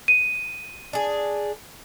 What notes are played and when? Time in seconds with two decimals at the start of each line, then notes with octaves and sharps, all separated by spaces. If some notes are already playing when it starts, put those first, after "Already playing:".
0.08 D#7
0.93 D4 G#4